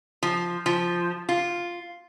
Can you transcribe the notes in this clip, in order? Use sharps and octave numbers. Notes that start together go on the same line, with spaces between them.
F3
F3
F4